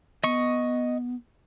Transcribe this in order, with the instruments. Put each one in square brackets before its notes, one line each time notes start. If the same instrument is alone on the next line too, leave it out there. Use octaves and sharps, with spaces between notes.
[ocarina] B3 [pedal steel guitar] D#5 C#6